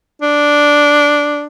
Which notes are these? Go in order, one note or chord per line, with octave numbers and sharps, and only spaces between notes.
D4